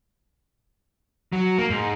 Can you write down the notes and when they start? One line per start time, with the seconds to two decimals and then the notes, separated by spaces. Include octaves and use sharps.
1.33 F#3
1.58 A#3
1.70 G#2